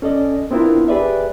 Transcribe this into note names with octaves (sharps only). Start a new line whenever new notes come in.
C#4 A4 D5 D#5
B3 C4 D4 E4 F4 A#4
G4 G#4 B4 D5 E5